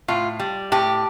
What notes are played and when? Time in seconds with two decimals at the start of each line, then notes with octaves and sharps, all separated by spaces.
0.08 A2 F4
0.40 G3
0.72 A2 G4